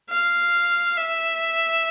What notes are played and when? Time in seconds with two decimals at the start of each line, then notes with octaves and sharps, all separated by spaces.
0.10 F5
0.97 E5